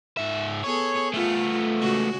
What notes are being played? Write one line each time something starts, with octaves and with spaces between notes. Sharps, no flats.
G#2 E5
B3 G#4 A4 C#5
A3 B3 F4
C#3 G#3 F#4